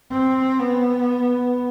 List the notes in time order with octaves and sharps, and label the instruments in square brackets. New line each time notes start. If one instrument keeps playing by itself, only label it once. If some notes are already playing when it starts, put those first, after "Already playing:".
[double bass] C4
B3